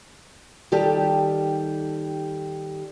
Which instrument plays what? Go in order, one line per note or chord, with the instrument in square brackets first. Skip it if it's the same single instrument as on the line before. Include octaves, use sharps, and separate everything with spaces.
[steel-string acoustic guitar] D#3 G3 G4 A4